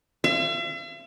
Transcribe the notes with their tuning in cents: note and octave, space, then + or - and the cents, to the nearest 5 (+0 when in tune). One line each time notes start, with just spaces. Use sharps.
E5 +45